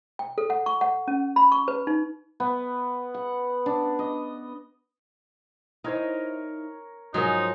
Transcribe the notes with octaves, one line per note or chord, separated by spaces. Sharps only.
G5
A4
F#5
C#6
F#5
C#4
B5
C#6
B4
D#4
B3
F#5
D4
D#5
D#4 E4 A#4 C5 C#5
G#2 F3 F#3 G#3 D#4 A#4